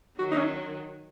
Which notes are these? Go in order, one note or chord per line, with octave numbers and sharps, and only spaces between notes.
D#3 F#3 F#4
D#4
C#4